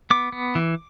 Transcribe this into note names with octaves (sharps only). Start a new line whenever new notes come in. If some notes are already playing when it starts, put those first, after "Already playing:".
B3 D6
B3
E3